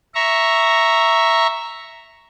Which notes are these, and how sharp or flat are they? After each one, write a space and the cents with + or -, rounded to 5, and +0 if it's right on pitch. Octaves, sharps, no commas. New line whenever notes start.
E5 +0 A#5 +0 C#6 +0